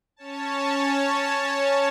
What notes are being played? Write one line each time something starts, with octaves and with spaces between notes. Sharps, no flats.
C#4 C#5 A5